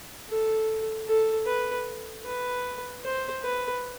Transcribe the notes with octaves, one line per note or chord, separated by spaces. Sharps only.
A4
A4
B4
B4
C5
B4